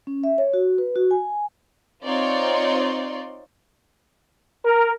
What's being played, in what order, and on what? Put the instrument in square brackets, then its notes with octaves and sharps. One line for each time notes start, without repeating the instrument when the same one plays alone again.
[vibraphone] C#4
E5
C#5
F#4
B4
F#4
G#5
[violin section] C4 D#4 F4 C#5 D5 C6
[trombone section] A#4